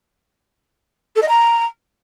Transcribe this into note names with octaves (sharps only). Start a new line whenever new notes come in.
A4
D#5
A#5